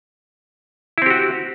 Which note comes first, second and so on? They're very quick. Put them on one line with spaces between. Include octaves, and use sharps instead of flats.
E4 C4 G4 F#4